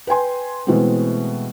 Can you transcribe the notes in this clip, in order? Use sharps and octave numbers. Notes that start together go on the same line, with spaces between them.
B4 G5 G#5 C6
B2 E3 G#3 A3 B3 C4